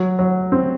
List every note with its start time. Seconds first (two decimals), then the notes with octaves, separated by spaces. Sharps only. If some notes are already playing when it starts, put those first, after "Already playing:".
Already playing: F#3
0.19 F#3
0.52 C4